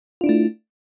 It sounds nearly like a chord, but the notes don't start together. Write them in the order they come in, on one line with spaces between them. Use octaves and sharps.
F4 D4 E4 A3